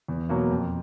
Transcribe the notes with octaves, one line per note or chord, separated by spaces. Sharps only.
E2
B2 F#3 A#3
F2